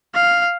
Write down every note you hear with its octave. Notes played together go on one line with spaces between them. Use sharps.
F5